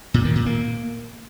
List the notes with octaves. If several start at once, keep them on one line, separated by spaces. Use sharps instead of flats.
A#2
D#3
A#2
A#3